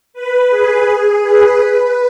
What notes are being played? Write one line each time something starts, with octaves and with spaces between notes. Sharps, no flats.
B4
G#4
B4
B4